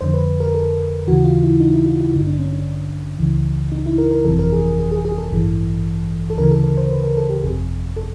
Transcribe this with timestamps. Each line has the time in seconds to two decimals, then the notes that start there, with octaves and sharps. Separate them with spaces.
0.01 F2 D3 C5
0.14 B4
0.40 A#4
0.55 A4
1.07 D#2 C#3 E3 F#4
1.24 F4
1.43 E4
1.60 D#4
1.74 E4
1.86 F4
2.00 E4
2.14 A1 G2 D3 D#4
2.27 D4
2.39 C#4
2.53 D4
3.19 C#2 C#3 E3
3.72 D#4
3.86 E4
3.98 A#4
4.11 A#4
4.25 G1 F2 C3 E3 A4
4.39 A#4
4.52 G#4
4.66 G#4
4.79 G#4
4.91 G#4
5.05 G#4
5.18 A4
5.31 A1 G2 E3
6.30 A4
6.37 D2 C#3 E3 A#4
6.51 A4
6.64 A#4
6.77 C5
6.90 B4
7.04 A#4
7.17 A4
7.30 G4
7.43 G1 F2 C3 G#4
7.96 A4